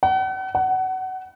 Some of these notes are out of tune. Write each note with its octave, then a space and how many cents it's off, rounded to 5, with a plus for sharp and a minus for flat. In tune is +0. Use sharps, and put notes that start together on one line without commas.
F#5 +40
F#5 +20